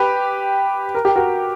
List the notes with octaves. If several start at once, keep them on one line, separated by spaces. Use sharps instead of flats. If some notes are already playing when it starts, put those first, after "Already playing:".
Already playing: G4 B4
A#4
G4
F#4 A#4